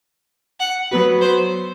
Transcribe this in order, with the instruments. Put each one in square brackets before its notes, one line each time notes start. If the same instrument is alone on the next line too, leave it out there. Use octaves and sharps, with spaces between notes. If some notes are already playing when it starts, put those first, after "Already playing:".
[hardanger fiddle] F#5
[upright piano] F#3 B3 F#4 [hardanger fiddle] B4
[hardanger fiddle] C5